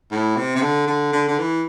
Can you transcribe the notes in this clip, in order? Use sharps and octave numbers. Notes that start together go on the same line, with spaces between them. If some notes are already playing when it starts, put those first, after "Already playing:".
A2
C3
C3
D3
D3
D3
D3
E3